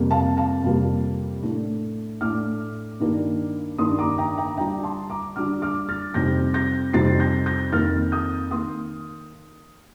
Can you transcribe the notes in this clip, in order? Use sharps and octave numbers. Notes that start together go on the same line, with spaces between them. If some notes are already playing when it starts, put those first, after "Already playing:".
Already playing: F2 C3 G3 A#3
F5 A5
F5 A5
F2 C3 G3 A#3
A2 A3 D4
A2 A3 D4 D6 F6
G2 D#3 A#3 D4
G2 D#3 A#3 D4 C6 D#6
A#5 D6
G5 A#5
G5 A#5
D3 G3 D4 G5 A#5
A5 C6
A#5 D6
D3 G3 D4 D6 F6
D6 F6
F6 A6
F2 C3 G3 C4 D#4 G6 A#6
G6 A#6
F2 C3 G3 C4 D#4 A6 C7
G6 A#6
G6 A#6
F2 D#3 A#3 F6 A6
D#6 G6
D#3 A#3 C6 D#6